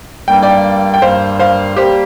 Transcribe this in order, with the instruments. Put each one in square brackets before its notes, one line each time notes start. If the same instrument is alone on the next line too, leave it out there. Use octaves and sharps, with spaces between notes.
[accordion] G2 G3 A#3 [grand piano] G5
[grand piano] D5 G5
G5
[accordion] G2 G3 A#3 [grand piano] C5 F5
[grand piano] C5 F5
[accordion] G3 A#3 [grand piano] G4 C5